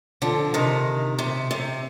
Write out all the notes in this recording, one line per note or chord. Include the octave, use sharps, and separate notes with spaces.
D3 F3
C3 D#3
C3
C3